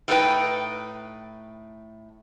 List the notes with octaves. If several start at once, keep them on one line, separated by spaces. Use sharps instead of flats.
A2 A3 D#4 F#4 B4 G5